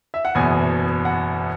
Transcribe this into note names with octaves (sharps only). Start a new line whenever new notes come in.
E5
F#5
F#1 E2 B2 G#5
F#5